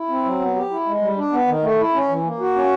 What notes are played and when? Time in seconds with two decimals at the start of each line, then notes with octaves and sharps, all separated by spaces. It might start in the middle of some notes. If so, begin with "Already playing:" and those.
Already playing: E4
0.09 C4
0.25 F#3
0.40 B3
0.56 G4
0.71 E4
0.86 G#3
1.01 G3
1.17 D4
1.32 B3
1.47 D#3
1.62 A3
1.78 E4
1.94 C#4
2.08 E3
2.24 A#3
2.40 F#4
2.55 C#4